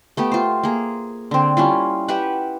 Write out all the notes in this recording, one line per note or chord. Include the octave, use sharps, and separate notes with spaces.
A3 B3 G4
F4 C5
A#3 G#4
D3 C4
G3 C#4 E4 F4
G4 B4 E5 F#5